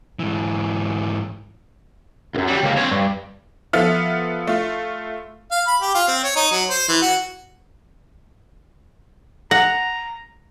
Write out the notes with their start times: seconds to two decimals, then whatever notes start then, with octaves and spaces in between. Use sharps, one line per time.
0.19 G#2 E3
2.35 C#2 F#2
2.48 F#3 G3
2.63 C#2 A#3
2.77 C4 C#5
2.91 G2
3.73 F3 B3 F4 A4 E5 F6
4.47 A3 F4
5.52 F5
5.67 B5
5.82 G4
5.95 F4
6.08 C4
6.24 C#5
6.36 D#4
6.52 F#3
6.70 C5
6.89 E3
7.02 F#4
9.51 F#5 A#5 A#6